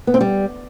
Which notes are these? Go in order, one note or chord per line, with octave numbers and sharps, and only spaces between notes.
B3
C4
G3